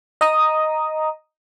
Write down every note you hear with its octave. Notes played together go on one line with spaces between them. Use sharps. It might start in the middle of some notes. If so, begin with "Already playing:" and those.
D#5 A#5 D#6